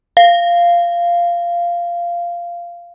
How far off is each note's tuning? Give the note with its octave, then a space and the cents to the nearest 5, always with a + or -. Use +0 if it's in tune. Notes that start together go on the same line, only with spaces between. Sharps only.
F5 -10